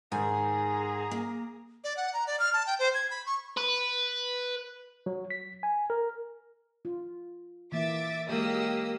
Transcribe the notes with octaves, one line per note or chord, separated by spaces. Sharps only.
G#2 D#3 G#4 G#5 A#5
A#3
D5
F#5
A#5
D5
F6
A5
G5
C5
G#6
B5
C#6
B4
F#3
B6
G#5
A#4
F4
E3 A#3 E5 D6 A6
F#3 G#3 A#3 G4 D#6 E6